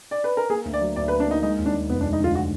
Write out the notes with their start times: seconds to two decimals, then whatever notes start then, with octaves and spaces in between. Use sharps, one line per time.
0.11 D5
0.24 B4
0.37 A#4
0.50 A#3 G#4
0.65 D2
0.73 D5
0.81 F#3
0.96 D2 D5
1.08 B4
1.12 A#3
1.20 D4
1.28 A#3 D#4
1.43 G#3 D#4
1.58 D#2
1.66 D4
1.74 G#3
1.89 F1 B3
2.01 D4
2.04 G#3
2.13 D#4
2.20 D3 F4
2.35 F#4